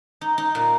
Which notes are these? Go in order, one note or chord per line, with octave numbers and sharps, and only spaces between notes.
D#4
D#4
A#2